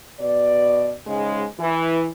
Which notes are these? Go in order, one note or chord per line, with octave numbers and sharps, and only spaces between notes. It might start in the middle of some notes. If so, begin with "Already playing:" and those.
B2 D5
G#2 C#3 G#3
E3